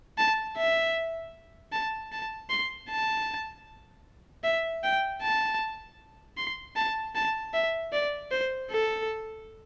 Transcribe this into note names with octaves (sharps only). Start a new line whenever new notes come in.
A5
E5
A5
A5
C6
A5
E5
G5
A5
C6
A5
A5
E5
D5
C5
A4